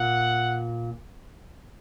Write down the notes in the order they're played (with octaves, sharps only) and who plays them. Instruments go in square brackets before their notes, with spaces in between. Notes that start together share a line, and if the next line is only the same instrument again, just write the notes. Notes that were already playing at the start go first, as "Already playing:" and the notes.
Already playing: [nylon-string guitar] A#2 [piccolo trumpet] F#5